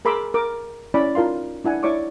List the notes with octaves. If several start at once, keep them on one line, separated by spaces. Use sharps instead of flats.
G#4 A#4 B5 C6 D6 E6
A#4 D6
C#4 E4 D5 B5
D#4 F4 A#4 F5 C6
D4 E4 F#5 G#5
E4 C#5 D5 C#6 D6